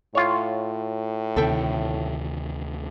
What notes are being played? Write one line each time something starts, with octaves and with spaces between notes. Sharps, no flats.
A2 F4 C#5
D2 C3 D#3 A4 E5 G5